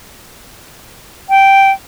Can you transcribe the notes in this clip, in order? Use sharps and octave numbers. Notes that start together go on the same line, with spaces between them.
G5